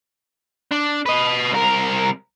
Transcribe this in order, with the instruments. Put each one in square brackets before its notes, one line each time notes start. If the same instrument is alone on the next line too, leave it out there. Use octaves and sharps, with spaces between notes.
[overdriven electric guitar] D4
B4 D#5
C2 A#4